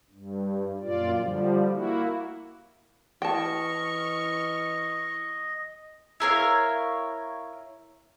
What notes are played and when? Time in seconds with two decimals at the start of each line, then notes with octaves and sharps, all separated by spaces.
0.11 G2
0.81 F#2 A#2 F4 D5
1.18 D3 F3 G3
1.71 A#3 E4 F#4
3.22 E3 D#5 G5 A5 C#6 F6
6.20 E4 A#4 C#5 F5